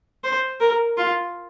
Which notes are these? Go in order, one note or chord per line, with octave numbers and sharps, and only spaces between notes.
C5
A#4
F4